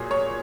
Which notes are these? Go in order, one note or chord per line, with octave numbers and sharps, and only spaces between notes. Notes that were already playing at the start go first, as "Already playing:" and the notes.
Already playing: A#2 F#3 G#4
C#5